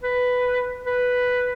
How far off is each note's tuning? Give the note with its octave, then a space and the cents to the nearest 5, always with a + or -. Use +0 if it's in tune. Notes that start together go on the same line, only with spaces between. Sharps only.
B4 +5
B4 +0